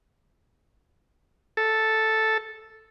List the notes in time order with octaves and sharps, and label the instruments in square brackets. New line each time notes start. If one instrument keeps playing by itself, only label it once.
[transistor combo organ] A4